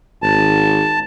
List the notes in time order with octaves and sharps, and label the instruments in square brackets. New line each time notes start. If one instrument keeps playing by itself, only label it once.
[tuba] G#1 [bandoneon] A5